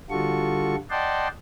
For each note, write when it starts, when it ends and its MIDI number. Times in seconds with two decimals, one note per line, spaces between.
0.10 0.75 50
0.10 0.75 55
0.10 0.75 65
0.10 0.75 66
0.10 0.75 69
0.10 0.75 85
0.91 1.28 74
0.91 1.28 75
0.91 1.28 78
0.91 1.28 79
0.91 1.28 81
0.91 1.28 84